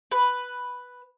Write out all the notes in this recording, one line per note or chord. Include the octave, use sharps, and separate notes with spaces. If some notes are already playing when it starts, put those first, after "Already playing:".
B4